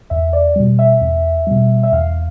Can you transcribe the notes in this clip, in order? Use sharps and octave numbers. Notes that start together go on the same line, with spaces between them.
E2 E5
D5
B2 G3
E5
E2
B2 G3
E5
E2 F5